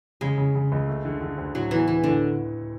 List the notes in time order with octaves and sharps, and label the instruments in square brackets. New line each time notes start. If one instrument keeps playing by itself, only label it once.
[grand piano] C#3 [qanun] G#3
[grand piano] C#3
C#3
C#2
A3
D3
D3
D2
[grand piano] A2 [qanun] F#3
[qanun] E3 [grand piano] B3
[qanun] E3 [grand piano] B3
[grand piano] A2 [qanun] D3